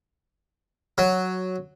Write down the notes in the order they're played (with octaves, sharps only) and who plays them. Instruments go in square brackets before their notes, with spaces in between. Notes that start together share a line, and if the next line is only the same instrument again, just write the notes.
[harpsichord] F#3